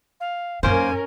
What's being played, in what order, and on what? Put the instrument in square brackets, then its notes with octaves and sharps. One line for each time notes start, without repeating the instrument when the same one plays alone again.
[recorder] F5
[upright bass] F#2 D#4 [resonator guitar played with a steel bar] A#3 C5 [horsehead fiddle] C#4 A#4 [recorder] G#5